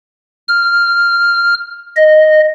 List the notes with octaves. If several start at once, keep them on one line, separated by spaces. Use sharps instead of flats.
F6
D#5